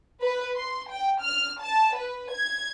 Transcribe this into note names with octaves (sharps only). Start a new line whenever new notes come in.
B4
C6
G5
F6
A5
B4
G#6